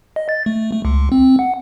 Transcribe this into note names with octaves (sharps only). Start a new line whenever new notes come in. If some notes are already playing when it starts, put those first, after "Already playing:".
D#5
A6
A3
A3
C#2
C4
F#5